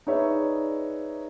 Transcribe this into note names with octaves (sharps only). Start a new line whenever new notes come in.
D#4 G#4 B4 C#5 D5 E5